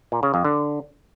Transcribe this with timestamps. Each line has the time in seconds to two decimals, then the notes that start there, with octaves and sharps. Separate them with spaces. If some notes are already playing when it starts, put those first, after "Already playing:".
0.12 A#2
0.23 C#3
0.34 F2
0.44 D3